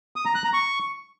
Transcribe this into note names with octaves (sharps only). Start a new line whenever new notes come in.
D#6
A#5
F#6
A#5
C#6